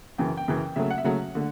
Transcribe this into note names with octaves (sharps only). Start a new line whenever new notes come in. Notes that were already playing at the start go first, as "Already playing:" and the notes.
F#2 C#3 E3 G5
G5
F#2 C#3 E3
C#3 F#3 A3 E5
F#5
E5
C#3 F#3 A3 F#5
D3 A3